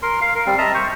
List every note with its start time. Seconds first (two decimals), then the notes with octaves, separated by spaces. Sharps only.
0.02 A#4 C6
0.21 F5
0.35 A#4
0.46 G3 C4
0.58 D#5 E5 A5 A#5
0.75 C5 C#6